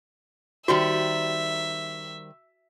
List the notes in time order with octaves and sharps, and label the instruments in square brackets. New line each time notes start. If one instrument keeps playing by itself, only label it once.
[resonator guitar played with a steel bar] D#3 G3 C5 [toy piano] F#4 [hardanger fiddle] E5